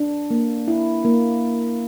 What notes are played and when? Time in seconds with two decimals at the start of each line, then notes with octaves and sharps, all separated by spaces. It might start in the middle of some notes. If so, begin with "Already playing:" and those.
Already playing: D4
0.30 A#3
0.68 E4
1.05 A#3